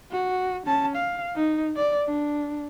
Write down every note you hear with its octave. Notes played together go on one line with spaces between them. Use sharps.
F#4
C#4 A5
F5
D#4
D5
D4